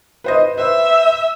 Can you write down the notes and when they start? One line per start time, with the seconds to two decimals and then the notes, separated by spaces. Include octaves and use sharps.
0.24 B4 C5 D#5
0.57 B4 C5 E5